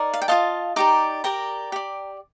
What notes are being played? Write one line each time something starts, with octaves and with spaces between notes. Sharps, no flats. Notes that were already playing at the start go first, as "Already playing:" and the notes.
Already playing: D#4 A#4 D5
F5
G5
F4 C5 D#5 F5 A5
D#4 G4 D5 A#5 D6
G4 A#4 D5 G5 A#5
G4 D5